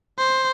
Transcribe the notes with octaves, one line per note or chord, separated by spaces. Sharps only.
C5